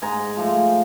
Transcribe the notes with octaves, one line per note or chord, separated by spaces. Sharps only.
G#2 G#5 A#5
F3 A3